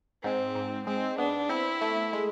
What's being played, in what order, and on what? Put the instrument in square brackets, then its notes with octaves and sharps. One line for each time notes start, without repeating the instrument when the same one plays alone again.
[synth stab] G#2 [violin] C4
[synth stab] G#2
[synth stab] G#3 [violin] C4
[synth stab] B3 [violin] D4
[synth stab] C4 [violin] E4
[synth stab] A3
G#3